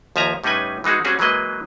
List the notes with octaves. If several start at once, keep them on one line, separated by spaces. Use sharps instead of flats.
D#2 F3 E5 G#5 A#5
A2 G3 C#4 D#4 B4 G#5
E3 G#3 D#4 F#4 G#4
G3 C4 C#4 F#4 G#4
E3 F#3 G#3 A#3 B4 D#5